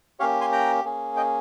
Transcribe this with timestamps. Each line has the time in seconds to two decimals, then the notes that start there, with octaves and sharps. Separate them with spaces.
0.20 A#3 C#4 G4 C#5 F5
0.41 G#5 C6
0.52 G5 A#5
0.84 A#3 C#4 G#4
1.17 D#5 G5